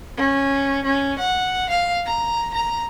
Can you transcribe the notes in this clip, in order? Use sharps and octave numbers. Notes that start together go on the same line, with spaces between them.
C#4
C#4
F#5
F5
A#5
A#5